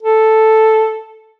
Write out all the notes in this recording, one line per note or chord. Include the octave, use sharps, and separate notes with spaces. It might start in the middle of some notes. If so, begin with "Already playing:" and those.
A4